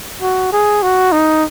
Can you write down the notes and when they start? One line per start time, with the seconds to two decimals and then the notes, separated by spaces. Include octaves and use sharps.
0.22 F#4
0.52 G#4
0.83 F#4
1.12 D#4